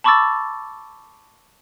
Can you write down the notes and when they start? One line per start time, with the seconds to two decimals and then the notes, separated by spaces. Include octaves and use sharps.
0.04 A5 B5 C#6 D6 E6 A6